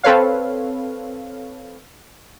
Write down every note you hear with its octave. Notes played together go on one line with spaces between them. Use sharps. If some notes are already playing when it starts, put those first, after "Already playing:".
C4 A4 B4 C#5 F5